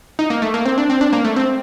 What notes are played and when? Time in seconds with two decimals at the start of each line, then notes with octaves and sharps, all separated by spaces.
0.19 D#4
0.30 A#3
0.42 A3
0.54 A#3
0.65 C4
0.78 D4
0.90 C4
1.01 D4
1.13 A#3
1.24 A3
1.36 C4